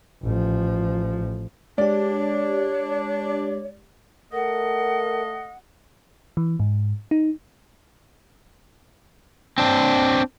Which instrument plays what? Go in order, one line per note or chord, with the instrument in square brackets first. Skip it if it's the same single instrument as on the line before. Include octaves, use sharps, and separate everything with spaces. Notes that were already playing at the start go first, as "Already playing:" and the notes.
[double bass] A1 F3
[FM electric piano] G#3 G4 [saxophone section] D4 [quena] C#5 [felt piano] D5
[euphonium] A3 [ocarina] A#4 [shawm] D#5 [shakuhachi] F#5
[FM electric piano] E3
G#2
D#4
[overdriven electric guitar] C4 D4